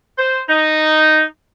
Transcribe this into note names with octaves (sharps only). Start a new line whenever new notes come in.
C5
D#4